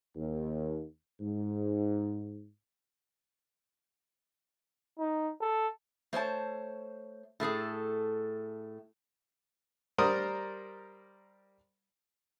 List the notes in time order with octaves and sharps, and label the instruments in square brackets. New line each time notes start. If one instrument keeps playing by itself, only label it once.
[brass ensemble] D#2
G#2
[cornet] D#4
A4
[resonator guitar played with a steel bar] A3 C5 C#5 A5
A2 A3 G#4 A4
[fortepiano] G3 A#4 C5 D5 D#6